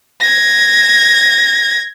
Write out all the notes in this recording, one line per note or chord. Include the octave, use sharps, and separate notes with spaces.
G#6 A#6